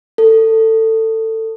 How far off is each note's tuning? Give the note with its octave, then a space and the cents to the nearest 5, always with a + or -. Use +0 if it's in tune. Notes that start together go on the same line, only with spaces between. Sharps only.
A4 +20